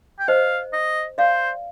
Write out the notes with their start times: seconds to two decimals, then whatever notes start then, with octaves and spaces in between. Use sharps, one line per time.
0.19 G5
0.28 C5 D#5 F5
0.73 D#5
1.18 C5 D5 F5